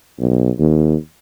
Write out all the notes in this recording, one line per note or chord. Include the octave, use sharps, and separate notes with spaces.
B1
D#2